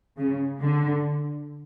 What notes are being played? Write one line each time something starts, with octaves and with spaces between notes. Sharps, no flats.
C#3
D3